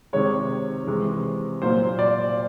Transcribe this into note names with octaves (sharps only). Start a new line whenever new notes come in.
C3 D#3 G#3 C#5
C3 E3 G#3
A#2 F#3 A#3 C5
D5